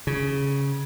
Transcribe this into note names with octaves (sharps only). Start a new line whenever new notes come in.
C#3